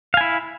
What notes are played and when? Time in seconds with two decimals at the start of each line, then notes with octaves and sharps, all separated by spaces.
0.14 F5
0.17 G#5
0.21 E4